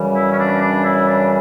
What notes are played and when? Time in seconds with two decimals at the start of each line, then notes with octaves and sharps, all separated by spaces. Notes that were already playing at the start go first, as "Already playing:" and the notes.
Already playing: F#2 C#3 E3 G3
0.16 E4
0.32 C#4
0.38 D4
0.61 D4
0.84 E4
1.07 D4